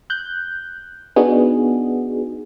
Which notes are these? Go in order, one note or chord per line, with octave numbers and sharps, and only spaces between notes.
F#6 G6
B3 D4 D#4 F#4 G#4